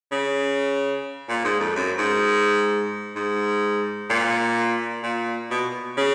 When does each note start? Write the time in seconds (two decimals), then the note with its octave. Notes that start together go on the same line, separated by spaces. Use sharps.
0.12 C#3
1.29 A#2
1.45 G#2
1.60 F2
1.76 F#2
1.98 G#2
3.16 G#2
4.10 A#2
5.03 A#2
5.51 B2
5.97 C#3